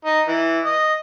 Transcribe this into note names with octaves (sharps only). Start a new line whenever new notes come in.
D#4
E3
D#5